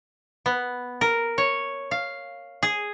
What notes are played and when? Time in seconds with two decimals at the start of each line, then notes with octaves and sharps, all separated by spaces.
0.46 B3
1.01 A#4
1.38 C#5
1.91 F5
2.63 G#4